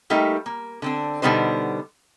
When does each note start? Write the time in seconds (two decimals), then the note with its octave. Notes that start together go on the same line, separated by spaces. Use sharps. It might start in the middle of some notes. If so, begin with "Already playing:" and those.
0.10 G3 A3 A#3 D#4 G4
0.46 A#3
0.82 D3 C4 D4
1.22 B2 D3 G3 B3 D#4 C5